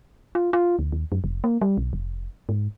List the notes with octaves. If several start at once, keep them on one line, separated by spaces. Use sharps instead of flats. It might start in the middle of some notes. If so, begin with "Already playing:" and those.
F4
F4
D2
D#2
F#2
F1
A#3
G3
B1
F1
G#2